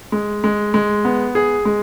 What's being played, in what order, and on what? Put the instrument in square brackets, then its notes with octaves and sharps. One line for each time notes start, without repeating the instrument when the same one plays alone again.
[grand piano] G#3
G#3
G#3
B3
G#4
G#3